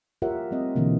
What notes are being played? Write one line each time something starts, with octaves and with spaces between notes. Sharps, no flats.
F4 G4 A#4 C#5 E5 F#5
G3 A3 C4 D#5
B2 D3 E3 A#3 C4